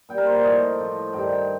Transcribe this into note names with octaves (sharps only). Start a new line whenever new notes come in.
A#2 G3 G5
A#4
C5
D5
A2 F3 D#5
A2 F3
G2 D#3 G3 G5
G5